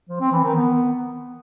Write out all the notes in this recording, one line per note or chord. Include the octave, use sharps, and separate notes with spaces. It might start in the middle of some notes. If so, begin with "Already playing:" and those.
F3
C4
E3
D#3
B3